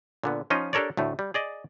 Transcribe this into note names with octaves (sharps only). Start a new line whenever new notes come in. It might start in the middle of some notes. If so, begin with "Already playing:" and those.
A#2 D3 B3
F3 C#4 D#4 F4 D#5
D4 G4 A4 A#4 C#5 D5
D2 A2 A3
G3
G#4 D5 D#5